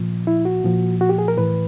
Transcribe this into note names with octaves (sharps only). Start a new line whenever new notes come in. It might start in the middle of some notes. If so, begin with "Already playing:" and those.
Already playing: A#2 F3
E4
F#4
A#2 F3
F#4
G4
G#4
A#4
A2 E3 B4